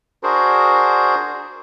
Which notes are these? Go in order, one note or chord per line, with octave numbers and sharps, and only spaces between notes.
D4 F#4 G#4 A#4 C5